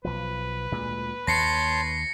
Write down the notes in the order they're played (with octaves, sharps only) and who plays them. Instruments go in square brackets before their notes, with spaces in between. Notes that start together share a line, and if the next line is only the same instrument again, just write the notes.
[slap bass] B1 F3 [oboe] B4
[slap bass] D2 A#2 G#3
[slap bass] D#2 [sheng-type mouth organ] C#5 A5 C6 [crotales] A#6 C7 C#7